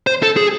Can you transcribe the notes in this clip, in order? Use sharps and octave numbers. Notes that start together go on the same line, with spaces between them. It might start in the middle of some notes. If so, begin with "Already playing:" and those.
C5
A4
G#4